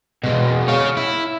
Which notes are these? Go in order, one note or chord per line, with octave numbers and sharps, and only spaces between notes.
B2 G#3
C#5 F5
E4